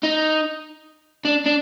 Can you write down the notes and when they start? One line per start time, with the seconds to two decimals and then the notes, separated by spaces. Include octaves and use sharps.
0.04 D#4
1.25 D4
1.46 D4